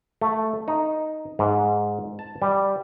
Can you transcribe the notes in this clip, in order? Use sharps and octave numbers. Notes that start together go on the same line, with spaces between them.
A3
D#4
G#2
A5
G3